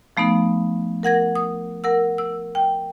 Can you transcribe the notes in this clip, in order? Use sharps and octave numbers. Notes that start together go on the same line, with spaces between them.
F3 A3 B3 D#4
A#4 F#5 G#6 A#6
D#6
A#4 F#5 E6
E6
G5